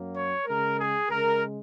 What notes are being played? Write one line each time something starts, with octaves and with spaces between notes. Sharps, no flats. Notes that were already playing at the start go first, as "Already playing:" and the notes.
Already playing: F#2 F#3 A#3
C#5
C#3 G#3 A#4
G#4
C#3 G#3 A#4